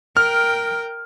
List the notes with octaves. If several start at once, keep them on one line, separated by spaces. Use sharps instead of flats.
A#4 G5 F6